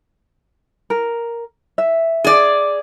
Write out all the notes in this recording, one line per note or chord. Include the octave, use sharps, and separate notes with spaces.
A#4
E5
G#4 D5